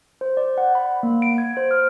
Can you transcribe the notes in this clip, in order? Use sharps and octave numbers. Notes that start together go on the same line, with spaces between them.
C5
D5
F#5
B5
A#3
D7
G#6
C5
F6